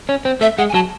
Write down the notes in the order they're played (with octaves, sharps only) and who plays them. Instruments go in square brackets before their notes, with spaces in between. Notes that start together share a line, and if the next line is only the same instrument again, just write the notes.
[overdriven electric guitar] C#4
C4
[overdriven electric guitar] A3 [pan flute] E5
[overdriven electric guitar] G#3 [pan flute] F#5
[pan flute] G#5
[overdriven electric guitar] F#3 [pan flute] A5